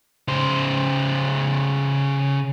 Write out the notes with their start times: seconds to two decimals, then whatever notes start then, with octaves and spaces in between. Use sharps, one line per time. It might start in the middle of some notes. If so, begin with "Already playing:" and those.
0.28 C#3 C5